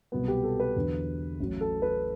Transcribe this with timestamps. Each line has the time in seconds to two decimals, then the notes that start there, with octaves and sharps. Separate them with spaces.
0.12 C2 B2 F#3 B3
0.28 G4
0.43 A4
0.60 B4
0.76 E2 D3 F#3
1.40 A1 A2 F#3
1.61 A4
1.82 B4